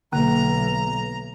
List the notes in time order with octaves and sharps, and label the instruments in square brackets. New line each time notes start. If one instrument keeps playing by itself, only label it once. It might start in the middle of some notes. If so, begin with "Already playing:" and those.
[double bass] B1 [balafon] D3 A#3 [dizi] A#5